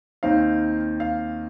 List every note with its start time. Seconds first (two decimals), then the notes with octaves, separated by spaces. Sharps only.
0.23 D#2 D#3 C4 D#4 F5
1.00 F5